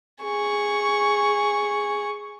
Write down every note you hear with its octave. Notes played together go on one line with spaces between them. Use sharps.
G#4 C#6